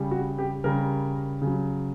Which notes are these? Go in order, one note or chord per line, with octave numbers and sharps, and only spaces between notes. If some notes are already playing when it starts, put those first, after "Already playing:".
Already playing: C#3 G3
F#4
G4
C#3 G3 A#4
C#3 F#3